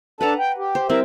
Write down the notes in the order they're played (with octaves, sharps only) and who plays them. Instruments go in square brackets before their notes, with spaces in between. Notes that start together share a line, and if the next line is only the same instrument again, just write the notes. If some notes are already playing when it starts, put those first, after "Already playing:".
[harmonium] D4 A4 A5 [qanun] B4 F#5 A#5
[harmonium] G5
G4
[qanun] C5
[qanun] G3 C4 E4 [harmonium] A#4 E5